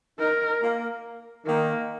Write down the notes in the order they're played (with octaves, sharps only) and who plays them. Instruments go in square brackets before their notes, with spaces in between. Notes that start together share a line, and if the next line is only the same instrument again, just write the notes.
[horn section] D#4 [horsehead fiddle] A#4
[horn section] A#3
[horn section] D#3 [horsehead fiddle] A#3